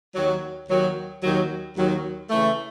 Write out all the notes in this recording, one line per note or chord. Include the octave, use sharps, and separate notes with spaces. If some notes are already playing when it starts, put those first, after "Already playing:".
D#2 D#3 F#3
D#2 D#3 F#3
D#2 D#3 F#3
D#2 D#3 F#3
C#3 E3 A3